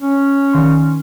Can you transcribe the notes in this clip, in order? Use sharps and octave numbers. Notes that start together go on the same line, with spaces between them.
C#4
D#3 C6